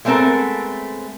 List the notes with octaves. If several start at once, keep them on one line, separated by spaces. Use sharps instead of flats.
G#3 A3 B3 C4 A4 A#4